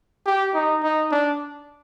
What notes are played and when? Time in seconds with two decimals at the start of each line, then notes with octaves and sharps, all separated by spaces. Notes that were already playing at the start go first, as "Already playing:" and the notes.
0.26 G4
0.55 D#4
0.83 D#4
1.12 D4